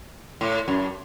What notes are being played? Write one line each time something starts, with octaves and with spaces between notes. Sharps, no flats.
A2
F#2